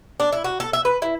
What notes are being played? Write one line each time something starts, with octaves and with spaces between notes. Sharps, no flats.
D4
E4
F#4
A4
E5
B4
E4